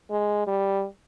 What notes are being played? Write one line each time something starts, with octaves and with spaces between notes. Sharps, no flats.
G#3
G3